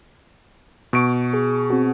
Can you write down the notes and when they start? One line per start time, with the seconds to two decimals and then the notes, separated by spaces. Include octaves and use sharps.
0.93 B2 C#6 D7
1.33 G#4
1.70 C4 F#4